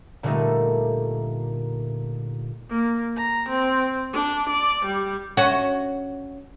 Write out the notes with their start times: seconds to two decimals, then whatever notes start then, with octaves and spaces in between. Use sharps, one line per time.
0.23 A#2 D3 G3 A3 D#4
2.70 A#3
3.16 A#5
3.49 C4
4.13 D4
4.49 D5
4.85 G3
5.37 C#4 F#4